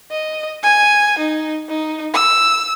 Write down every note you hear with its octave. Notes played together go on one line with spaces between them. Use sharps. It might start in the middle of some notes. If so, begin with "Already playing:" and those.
D#5
G#5
D#4
D#4
E6